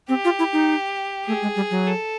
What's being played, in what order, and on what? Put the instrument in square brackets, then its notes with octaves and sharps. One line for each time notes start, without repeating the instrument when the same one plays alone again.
[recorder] C4 [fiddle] G4
[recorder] F4
E4
D#4
[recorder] A3 [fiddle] G#4
[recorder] G#3
G3
F#3
[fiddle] A4